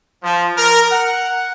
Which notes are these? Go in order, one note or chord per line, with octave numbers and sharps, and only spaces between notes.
F3
A#4
F#5